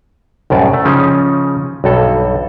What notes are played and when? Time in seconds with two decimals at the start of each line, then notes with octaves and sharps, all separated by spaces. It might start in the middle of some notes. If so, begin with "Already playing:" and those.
0.50 C2 F#2 A2 D5
0.74 A3
0.85 C#3 F3 C#4 D#4
1.84 B1 G2 A4